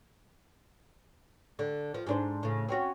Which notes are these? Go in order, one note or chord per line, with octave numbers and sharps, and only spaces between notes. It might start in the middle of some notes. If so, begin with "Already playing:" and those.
D3
F3
G#2 D4 C5
A2 C#3
C4 C#4 F#4